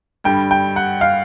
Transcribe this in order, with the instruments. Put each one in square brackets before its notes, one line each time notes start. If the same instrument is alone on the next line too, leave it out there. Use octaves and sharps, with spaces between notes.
[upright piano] G2 D3 G3 [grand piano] G5
[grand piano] G5
F#5
F5